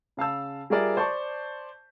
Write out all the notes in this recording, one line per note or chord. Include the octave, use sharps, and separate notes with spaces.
C#3 F5 A5 E6
G3 F4 G#4 A#4 D5 E5
C5 D5 A5 C#6